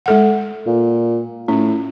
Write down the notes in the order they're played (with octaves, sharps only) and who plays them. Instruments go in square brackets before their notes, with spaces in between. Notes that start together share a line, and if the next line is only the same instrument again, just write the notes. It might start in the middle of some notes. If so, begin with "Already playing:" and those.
[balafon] G#3 A4 F#5
[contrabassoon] A#2
[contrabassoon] A2 [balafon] C#4